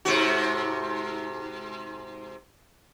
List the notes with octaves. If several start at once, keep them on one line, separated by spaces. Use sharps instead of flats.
G#2 C3 F#4